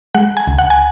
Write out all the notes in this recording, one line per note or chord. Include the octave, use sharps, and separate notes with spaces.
G#3 F#5
G#5
C#2
F#5
G#5